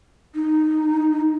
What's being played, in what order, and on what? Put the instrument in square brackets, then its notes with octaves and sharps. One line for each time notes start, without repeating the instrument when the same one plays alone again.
[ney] D#4